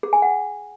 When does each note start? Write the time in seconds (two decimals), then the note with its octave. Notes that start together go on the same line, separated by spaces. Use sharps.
0.03 G#4
0.13 G#5
0.22 F#5